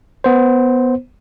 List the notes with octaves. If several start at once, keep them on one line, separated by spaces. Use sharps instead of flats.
B3 C5